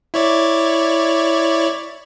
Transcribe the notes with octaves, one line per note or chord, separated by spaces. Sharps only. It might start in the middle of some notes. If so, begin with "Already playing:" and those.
E4 C#5 D5